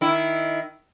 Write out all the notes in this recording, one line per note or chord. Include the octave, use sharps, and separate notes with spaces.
D#3 E4